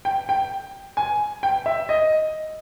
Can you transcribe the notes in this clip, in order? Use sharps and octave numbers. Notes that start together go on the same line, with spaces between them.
G5
G5
G#5
G5
E5
D#5